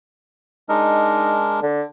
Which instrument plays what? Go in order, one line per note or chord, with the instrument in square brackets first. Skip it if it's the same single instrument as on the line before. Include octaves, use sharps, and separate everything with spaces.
[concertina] G#3 D4 A#4 [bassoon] D#4
[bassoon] D3